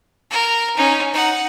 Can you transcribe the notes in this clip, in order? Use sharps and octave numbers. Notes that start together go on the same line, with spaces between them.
A#4
C#4 D#4
D#4 F#5